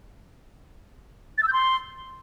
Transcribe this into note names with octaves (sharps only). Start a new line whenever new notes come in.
A6
E6
G6
C6